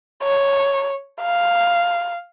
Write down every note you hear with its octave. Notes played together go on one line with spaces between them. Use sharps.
C#5
F5